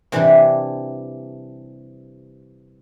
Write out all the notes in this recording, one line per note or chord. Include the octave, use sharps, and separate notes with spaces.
C3 E3 G3 D4 E4